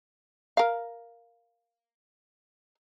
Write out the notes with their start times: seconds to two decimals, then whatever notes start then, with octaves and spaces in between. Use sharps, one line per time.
0.57 A#4 F5